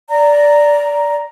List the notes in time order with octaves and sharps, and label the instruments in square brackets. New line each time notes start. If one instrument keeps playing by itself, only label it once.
[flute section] D5 A#5